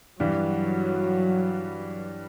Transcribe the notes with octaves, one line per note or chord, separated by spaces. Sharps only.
G2 E3 F#3 G3